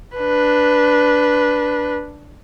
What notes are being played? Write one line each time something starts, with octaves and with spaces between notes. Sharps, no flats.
D4 B4